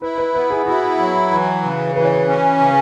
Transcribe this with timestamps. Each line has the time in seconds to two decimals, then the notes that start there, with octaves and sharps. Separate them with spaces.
0.02 E4 B4
0.18 B4
0.34 B3 B4
0.50 G#4
0.66 E4 F#4
0.98 F#3
1.31 E3
1.63 C#3
1.96 E3 B4
2.04 C#5
2.13 B4
2.27 C#4
2.59 C#3